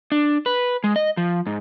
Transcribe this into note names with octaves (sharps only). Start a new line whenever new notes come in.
D4
B4
G#3
D#5
F3
G#2